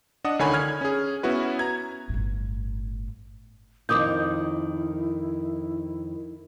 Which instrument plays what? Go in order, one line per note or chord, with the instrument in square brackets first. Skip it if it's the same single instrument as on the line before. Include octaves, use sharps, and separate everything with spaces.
[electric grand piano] D4 D#5 F#5 D#6
C#2 D3 D#3 C#5 G#5 B5
F6 G#6
C#4 G#4
B3 C#4 E4 F#4 B4
A#5 G#6
[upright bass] G1 A2
[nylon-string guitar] F2 D#3 F4 [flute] E4 [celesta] D6 D#6 G6